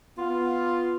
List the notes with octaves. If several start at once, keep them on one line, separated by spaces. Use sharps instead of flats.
B3 F4